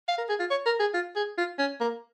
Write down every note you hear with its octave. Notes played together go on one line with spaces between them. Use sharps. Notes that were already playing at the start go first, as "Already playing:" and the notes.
F5
A#4
G#4
F4
C#5
A#4
G#4
F4
G#4
F4
C#4
A#3